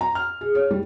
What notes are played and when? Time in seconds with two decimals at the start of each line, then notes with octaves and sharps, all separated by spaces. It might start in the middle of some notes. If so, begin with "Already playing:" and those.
0.01 A#5
0.15 F6
0.41 G#4
0.55 C#5
0.70 G3